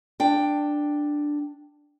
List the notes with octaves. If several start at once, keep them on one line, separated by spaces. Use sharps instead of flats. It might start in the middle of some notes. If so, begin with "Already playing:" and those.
D4 G5